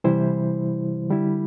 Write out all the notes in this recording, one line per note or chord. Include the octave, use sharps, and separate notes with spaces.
C3 E3 G3 E4 C5
D3 G3 E4